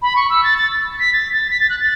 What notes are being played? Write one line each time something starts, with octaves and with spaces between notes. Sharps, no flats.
B5
C#6
E6
A6
A6
A6
B6
A6
A6
B6
A6
F#6
A6